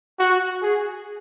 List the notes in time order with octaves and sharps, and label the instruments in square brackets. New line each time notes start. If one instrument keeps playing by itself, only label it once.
[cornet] F#4
G#4